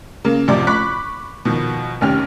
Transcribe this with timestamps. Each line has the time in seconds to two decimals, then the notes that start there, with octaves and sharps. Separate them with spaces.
0.25 C#3 A#3
0.48 A1 F#2 C3 F3 D5 D6
0.67 B5 C#6 D6 F#6 B6
1.45 B2 D#3 F3
2.01 F1 D#2 C#4 G4 F6